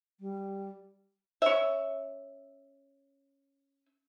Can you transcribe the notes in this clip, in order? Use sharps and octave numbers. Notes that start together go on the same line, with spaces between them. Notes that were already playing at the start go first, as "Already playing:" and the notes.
G3
C#4 E5